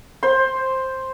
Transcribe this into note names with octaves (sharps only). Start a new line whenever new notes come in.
C5 C6